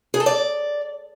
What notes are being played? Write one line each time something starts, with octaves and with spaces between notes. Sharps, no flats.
G#4
A4
D5